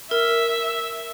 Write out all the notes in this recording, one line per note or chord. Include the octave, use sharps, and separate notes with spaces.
A#4 E5